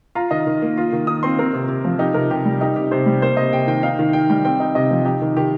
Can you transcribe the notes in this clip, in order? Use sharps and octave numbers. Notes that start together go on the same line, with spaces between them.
F4 A#5
D#3 D#5
D#3
A#3
F4
D#3
D#3 D#6
C4 C6
C4 A#4
C3
C3
F3
D#4 G4
C3 A#4
C3 G4
G3
D#4 G4
C3 G4
C3 C5
G3
A#3 C5
C3 D#5
C3 G5
D#3 G5
D#4 F5
D#3
D#3 G5
G3 G5
C4 G5
D#4
C3 D#5
F3
D#4 G4
D#3
D#3 G4